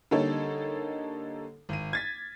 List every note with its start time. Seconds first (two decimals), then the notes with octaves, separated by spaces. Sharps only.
0.11 D3 G3 A#3 D#4 A4 C#5
1.69 G#1 D#7
1.93 G#6 A6 B6